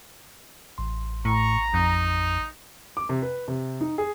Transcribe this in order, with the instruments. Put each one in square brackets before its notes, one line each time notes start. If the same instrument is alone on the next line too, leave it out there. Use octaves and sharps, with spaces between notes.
[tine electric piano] A1 C6
[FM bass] A2 [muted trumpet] A#5 [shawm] C#6
[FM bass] F2 [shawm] D#4
[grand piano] D6
C3
B4
C3
D#4
G#4